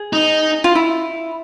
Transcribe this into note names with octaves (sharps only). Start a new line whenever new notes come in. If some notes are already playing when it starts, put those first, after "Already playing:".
Already playing: G#4
D#4
F4
E4